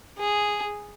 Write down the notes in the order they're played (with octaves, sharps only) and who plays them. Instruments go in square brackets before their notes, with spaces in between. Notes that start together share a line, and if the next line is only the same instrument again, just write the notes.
[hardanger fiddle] G#4